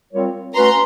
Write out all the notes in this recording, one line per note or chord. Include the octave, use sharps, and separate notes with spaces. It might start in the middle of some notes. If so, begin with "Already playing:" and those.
G3 C4 F4 A#4 C#5
A3 C#4 F#4 B4 A#5 C6